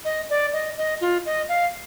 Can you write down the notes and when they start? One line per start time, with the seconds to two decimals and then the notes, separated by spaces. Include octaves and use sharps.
0.05 D#5
0.30 D5
0.53 D#5
0.78 D#5
1.01 F4
1.26 D#5
1.49 F5